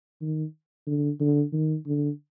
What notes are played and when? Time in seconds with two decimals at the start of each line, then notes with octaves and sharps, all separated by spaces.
0.21 D#3
0.87 D3
1.20 D3
1.53 D#3
1.86 D3